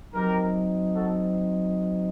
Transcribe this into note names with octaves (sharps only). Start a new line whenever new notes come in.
F#3 C4 D#4 G4 A#4
F#4 A4